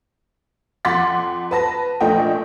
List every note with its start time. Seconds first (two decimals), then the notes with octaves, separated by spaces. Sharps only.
0.85 F2 F#5 C6 D6 A6 B6
1.51 B4 A5 A#6
2.01 A#1 A#2 F3 A3 D#5 G5